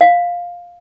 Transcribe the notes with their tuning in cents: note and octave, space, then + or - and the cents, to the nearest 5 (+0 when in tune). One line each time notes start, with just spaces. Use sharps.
F5 +10